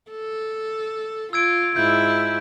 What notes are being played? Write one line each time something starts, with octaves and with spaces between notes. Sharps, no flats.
A4
F4 E6 G#6 D7
G#2 E4 F4 G6